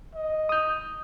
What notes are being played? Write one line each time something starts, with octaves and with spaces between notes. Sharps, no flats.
D#5
D#6 G6